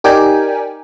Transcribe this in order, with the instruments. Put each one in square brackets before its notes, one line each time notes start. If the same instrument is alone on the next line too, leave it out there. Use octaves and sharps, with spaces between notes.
[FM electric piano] D#4 G4 A#4 D5 G5 G#5